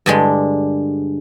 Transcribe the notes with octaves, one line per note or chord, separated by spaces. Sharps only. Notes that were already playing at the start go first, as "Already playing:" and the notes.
G2 D3 G#3